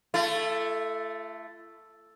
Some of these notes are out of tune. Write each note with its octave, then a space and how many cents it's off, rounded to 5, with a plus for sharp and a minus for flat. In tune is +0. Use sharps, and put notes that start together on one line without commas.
A3 +0 F4 -45